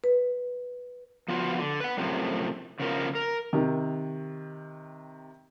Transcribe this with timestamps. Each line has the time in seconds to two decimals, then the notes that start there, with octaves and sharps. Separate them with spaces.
0.04 B4
1.28 F3 B3 F4 F#4
1.59 D3
1.80 B4 F#5
1.97 F#2 A2 C3 F3
2.80 C#3 F3 B3 A#4
3.15 A#4
3.53 C3 D#3